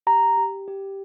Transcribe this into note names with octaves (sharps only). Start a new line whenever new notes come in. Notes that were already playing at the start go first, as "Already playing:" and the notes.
G4 A#5
G4
G4